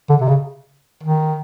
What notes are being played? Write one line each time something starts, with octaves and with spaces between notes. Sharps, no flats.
D3
C3
C#3
D#3